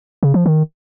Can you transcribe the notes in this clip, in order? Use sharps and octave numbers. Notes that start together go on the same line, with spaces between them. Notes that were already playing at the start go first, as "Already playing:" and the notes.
C#3
F3
D#3